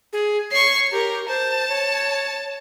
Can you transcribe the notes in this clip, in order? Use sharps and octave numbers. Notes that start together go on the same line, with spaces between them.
G#4
C#5 C#6 C7
G4 A#4
C5 A5
C#5